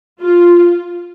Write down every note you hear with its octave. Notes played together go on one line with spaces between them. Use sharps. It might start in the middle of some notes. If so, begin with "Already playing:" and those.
F4